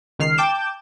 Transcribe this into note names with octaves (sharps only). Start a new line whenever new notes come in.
C#2 D#3 F6 C7
G5 A5 D6 G6 E7